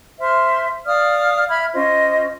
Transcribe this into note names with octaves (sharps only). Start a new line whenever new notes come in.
C5 E5 C6 F6
D5 F5 D#6 F6
E5 B5 F6 G#6
C#4 F4 C5 D#5